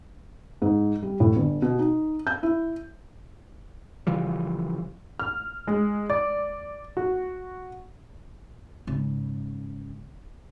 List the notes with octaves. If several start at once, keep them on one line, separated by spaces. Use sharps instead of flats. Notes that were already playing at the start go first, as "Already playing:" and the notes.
G#2
G3
A2
G1
B2
D#4
G6
E4
C#3 E3 F3 G3
F6
G#3
D5
F#4
G#2 C#3